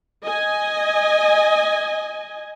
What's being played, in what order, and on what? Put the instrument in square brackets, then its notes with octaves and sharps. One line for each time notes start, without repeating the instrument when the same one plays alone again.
[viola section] D#5 G#5